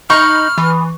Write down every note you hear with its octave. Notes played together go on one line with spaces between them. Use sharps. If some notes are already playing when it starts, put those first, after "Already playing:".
D#4 B5 C#6 F6
E3 B3